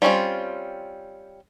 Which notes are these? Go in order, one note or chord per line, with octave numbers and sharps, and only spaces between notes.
G3 C4 C#4 E4 F4